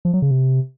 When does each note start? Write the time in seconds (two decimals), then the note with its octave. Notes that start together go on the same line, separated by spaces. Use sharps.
0.05 F3
0.14 F#3
0.22 C#3
0.31 C3